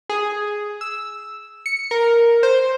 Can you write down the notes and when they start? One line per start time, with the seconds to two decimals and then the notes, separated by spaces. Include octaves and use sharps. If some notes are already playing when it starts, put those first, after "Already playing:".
0.09 G#4
0.81 E6
1.66 C#7
1.91 A#4
2.43 C5